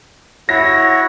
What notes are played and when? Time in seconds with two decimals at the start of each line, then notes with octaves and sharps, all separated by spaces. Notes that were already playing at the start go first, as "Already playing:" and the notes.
0.49 E4 F#4 C#5 A#6